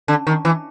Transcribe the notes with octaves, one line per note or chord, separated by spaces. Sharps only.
D3
D#3
E3